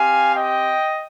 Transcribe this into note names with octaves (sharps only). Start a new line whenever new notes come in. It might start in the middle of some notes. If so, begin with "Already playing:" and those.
Already playing: C4 G4 F5 G#5
D#5 G5